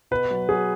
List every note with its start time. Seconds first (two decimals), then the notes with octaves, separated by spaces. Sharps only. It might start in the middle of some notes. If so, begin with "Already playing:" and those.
0.11 B2 B4
0.31 F#3
0.49 F#3 G#4